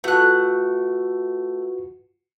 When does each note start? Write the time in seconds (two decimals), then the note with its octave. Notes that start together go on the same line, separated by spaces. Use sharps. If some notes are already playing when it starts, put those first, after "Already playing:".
0.04 A3 F4 F#4 B4 F#6